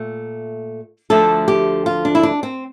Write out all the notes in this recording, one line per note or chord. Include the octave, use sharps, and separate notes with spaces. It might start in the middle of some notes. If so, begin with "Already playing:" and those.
Already playing: A#2 A3
D2 D3 F3 A3 A4
G4
F4
D4
E4
D4
C4